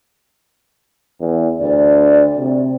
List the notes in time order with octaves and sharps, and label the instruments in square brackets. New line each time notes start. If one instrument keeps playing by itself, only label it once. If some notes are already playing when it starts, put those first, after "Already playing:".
[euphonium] E2
[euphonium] D2 [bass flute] D5
[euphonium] C3